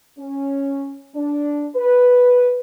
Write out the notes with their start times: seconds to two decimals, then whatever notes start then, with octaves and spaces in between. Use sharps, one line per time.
0.18 C#4
1.14 D4
1.75 B4